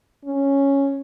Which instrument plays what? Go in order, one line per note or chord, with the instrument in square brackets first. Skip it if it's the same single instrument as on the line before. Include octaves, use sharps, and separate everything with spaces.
[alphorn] C#4